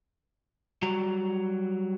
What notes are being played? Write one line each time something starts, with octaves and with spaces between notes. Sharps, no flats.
F#3 G3 F#4 D5 A#5